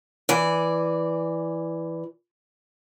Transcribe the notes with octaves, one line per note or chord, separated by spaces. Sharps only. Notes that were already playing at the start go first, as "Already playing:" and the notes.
E3 D5